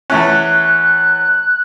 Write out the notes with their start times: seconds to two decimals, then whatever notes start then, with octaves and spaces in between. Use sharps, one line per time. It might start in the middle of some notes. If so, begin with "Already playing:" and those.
0.10 E2 A3 C#4 F#6